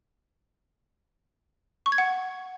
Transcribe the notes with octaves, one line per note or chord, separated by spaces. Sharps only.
C#6
G#6
F#5